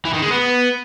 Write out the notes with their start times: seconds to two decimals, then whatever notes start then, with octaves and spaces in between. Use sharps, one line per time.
0.05 E3
0.14 D#3
0.22 G#3
0.31 B3